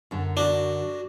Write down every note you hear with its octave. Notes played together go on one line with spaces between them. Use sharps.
F#2 D3
D4 F#4